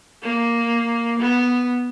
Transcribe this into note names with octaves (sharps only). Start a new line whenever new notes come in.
A#3
B3